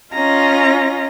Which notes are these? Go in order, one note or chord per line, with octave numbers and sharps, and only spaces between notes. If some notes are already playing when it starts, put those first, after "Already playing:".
C#4 F4 D#5 A#5